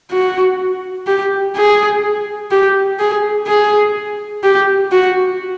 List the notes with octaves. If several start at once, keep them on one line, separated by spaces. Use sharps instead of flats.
F#4
G4
G#4
G4
G#4
G#4
G4
F#4